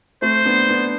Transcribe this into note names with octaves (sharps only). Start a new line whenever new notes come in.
A3 C4 C5
B3 D4
B3 D4